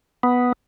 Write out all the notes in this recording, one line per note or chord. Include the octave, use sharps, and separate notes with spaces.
B3